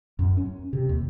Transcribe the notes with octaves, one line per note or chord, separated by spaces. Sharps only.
F#2
C#4
C3
D#2